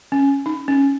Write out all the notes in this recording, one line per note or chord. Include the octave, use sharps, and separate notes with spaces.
C#4
D#4
C#4